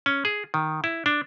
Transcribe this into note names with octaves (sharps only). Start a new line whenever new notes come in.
C#4
G#4
D#3
E4
D4